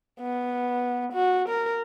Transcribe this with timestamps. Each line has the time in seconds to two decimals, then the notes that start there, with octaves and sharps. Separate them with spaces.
0.21 B3
1.13 F#4
1.49 A#4